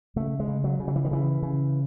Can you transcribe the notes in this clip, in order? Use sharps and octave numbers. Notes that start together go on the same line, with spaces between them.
C#3 A3
G#3
C#3
F#3
C#3
F#3
E3
D#3
C#3 E3
C#3